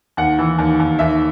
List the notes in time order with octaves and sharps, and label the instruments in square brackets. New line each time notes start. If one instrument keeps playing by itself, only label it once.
[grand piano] D#2 F#5
E3
D#2
D#2
D#2 E5